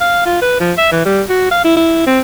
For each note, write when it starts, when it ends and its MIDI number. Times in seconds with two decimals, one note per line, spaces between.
0.01 0.25 77
0.26 0.38 65
0.42 0.55 71
0.60 0.72 53
0.78 0.89 76
0.92 1.02 52
1.06 1.22 55
1.29 1.46 66
1.51 1.61 77
1.64 1.73 64
1.76 2.03 64
2.07 2.20 60